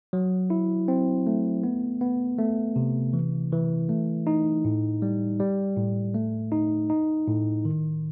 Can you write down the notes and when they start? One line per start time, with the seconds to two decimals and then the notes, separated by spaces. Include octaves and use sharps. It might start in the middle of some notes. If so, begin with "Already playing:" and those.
0.13 F#3
0.50 E4
0.88 C4
1.27 A3
1.64 B3
2.01 B3
2.39 A3
2.76 C3
3.13 E3
3.52 E3
3.89 A3
4.27 D#4
4.65 A2
5.02 G3
5.40 G3
5.77 A2
6.15 A3
6.52 D#4
6.90 D#4
7.28 A2
7.65 D#3